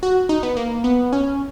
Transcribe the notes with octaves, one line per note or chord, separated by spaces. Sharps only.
F#4
D#4
B3
A#3
B3
C#4